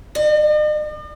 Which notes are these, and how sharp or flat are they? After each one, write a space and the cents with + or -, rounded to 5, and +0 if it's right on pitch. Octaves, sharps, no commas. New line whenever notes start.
D#5 -45